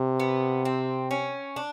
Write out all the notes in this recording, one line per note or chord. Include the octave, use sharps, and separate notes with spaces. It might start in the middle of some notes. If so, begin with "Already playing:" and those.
Already playing: C3
B3
C4
C#4
D4